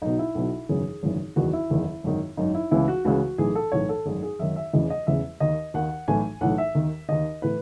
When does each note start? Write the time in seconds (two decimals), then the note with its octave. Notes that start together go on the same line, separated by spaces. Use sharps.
0.02 B1 B2 D#4
0.19 E4
0.35 B1 B2
0.69 G#1 F#2 C#3 E3 G#4
1.03 G#1 F#2 C#3 E3
1.36 F#1 E2 D#3 F#4
1.53 E4
1.70 F#1 E2 D#3
2.04 G#1 F#2 D#3
2.37 G#1 F#2 D#3 D#4
2.54 E4
2.71 C#2 C#3 E3 E4
2.88 F#4
3.05 C#2 C#3 E3 F#4
3.38 B1 A2 E3 G#4
3.55 A4
3.72 B1 A2 E3 C#5
3.89 A4
4.05 G#1 F#2 D#3 G#4
4.23 G#4
4.39 G#1 F#2 D#3 E5
4.56 E5
4.73 E1 E2 C#3 E3 D#5
4.90 D#5
5.07 E1 E2 C#3 E3 E5
5.40 D#2 D#3 D#5
5.74 D#2 D#3 F#5
6.08 B1 A2 E3 G#5
6.41 B1 A2 E3 F#5
6.58 E5
6.75 D#2 D#3
7.08 D#2 D#3 D#5
7.42 A2 E3 B4